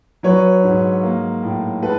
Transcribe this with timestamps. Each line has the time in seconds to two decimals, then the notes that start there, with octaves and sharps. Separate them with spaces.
0.23 F#3 B4 C#5
0.64 G#2
1.03 A#3
1.43 A2
1.82 G#3 A4 B4